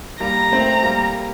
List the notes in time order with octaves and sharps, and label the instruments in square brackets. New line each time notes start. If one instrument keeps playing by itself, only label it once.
[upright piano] G3 A#3 [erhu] A#5
[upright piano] A3 C4
G3 A#3